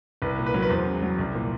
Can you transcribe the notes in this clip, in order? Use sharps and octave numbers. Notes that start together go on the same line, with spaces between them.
C2 B4
A#2
B4
F#3 A#4
B4
E2 C5
C#3
F#3
C2
A#2